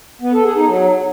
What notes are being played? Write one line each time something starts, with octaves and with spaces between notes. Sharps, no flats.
B3
A4
G#4
D#4
F#3